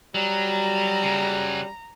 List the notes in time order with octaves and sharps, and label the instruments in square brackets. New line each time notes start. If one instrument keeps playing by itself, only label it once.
[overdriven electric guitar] F#3 [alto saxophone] G3 [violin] A#5
[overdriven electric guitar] C#3 F#3